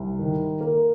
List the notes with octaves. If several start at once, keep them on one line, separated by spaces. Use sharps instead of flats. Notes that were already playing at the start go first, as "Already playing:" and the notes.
Already playing: C2
D#3
A#3